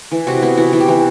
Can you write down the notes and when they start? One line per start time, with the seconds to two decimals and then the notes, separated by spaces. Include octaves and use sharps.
0.11 E3
0.27 C3 F#4
0.42 B3 E4
0.57 E3 F#4
0.73 E3
0.80 G4
0.88 E3